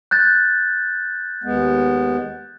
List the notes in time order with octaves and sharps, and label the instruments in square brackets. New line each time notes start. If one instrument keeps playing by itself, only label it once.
[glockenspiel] F#6 G6 A6
[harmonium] D#2 G#3 B3